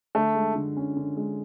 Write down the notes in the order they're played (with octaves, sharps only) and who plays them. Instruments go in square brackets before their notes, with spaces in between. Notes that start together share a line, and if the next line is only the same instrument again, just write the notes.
[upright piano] D3 [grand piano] A3
[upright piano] G#3
D3
C#4
D3
G#3